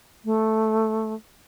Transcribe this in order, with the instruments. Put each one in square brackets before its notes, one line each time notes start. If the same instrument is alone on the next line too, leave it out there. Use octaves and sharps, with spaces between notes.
[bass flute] A3